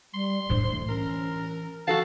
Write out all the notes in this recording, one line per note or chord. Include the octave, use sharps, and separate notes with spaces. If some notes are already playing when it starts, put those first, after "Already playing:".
G3 C6
A2 D3 C5
E3 A3
C#4 A#4
F3 F#4 A4 F5 A5